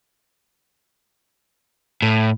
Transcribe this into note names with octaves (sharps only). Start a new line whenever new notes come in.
A2